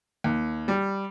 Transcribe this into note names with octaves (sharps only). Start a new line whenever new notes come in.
D#2
G3